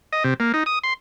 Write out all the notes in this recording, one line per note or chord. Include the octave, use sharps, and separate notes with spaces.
D#5
C3
A#3
D#4
D#6
C6